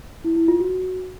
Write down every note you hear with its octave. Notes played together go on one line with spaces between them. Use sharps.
E4
E4
F4
F#4